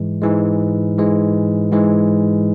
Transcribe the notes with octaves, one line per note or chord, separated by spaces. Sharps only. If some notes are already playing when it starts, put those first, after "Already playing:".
Already playing: G#2 E3 G#3
G#2 E3 G#3
G#2 E3 G#3
G#2 E3 G#3